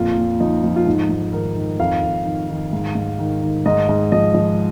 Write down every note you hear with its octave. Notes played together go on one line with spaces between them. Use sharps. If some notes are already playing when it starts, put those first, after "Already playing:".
Already playing: F2 A#2 F4
A#2
F3 D#4
F3
F4
G#2 D#4
G#2
D#3 A#4
D#3
F2 F5
F2
D#3
D#3
G#2
G#2
D#3
D#3
G#2 D#5
G#2
F3 D#5
F3